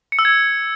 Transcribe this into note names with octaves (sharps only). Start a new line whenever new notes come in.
C#7
E6
G#6